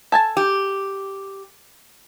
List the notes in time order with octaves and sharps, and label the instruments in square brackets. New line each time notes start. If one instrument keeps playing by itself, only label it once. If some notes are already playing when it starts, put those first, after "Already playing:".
[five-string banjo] A4 G#5 A5
[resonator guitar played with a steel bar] G4